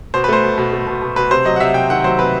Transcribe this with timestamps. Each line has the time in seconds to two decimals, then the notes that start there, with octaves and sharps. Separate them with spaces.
0.14 B2 C5
0.24 B4
0.29 A3 C5
0.44 B2
0.58 B2
0.73 A3
0.87 B2
1.02 B2
1.16 B2 B4
1.30 C3 C5
1.45 F#3 D#5
1.56 F#5
1.60 C3 E5
1.74 C3 G5
1.90 D#3 F#5
2.04 F#3 C5
2.19 C3 B4